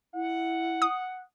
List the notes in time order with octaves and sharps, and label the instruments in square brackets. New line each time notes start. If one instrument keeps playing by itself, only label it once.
[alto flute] E4 [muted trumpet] F#5
[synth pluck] D#6